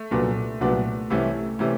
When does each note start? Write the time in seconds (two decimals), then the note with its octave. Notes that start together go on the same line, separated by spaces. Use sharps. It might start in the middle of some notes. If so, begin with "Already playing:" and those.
Already playing: A3
0.11 C2 A#2 F#3 B3 D4
0.60 C2 A#2 F#3 B3 D4
1.10 C2 C3 E3 A3 C#4
1.59 C3 E3 A3 C#4